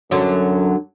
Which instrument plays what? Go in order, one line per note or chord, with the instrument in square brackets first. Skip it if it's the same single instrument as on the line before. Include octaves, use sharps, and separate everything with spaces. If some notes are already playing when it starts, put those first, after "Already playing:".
[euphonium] F#2 [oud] D3 F#3